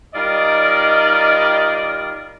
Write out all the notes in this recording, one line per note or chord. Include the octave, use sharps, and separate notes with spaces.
G3 D#4 F4 A#4 D5 D#5